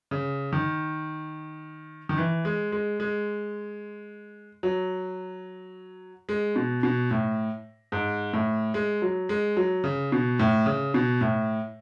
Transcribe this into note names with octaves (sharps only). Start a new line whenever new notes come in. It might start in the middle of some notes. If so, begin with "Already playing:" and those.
C#3
D#3
D#3
E3
G#3
G#3
G#3
F#3
G#3
B2
B2
A2
G#2
A2
G#3
F#3
G#3
F#3
C#3
B2
A2
C#3
B2
A2